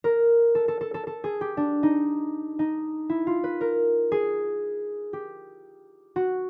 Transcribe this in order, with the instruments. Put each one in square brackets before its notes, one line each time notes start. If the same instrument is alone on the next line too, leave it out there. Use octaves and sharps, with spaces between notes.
[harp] A#4
A4
A4
A4
A4
A4
G#4
G4
D4
D#4
D#4
E4
F4
B4
A#4
G#4
G4
F#4